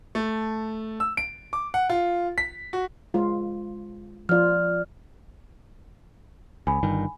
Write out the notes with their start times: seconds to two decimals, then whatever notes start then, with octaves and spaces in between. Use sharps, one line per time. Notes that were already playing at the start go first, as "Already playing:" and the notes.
0.15 A3
1.00 E6
1.17 D7
1.53 D6
1.74 F#5
1.89 F4
2.38 B6
2.73 F#4
3.14 G#3 F4
4.29 F3 F4 D5 F6
6.67 C#2 G#5 B5
6.83 G1 G2 D#3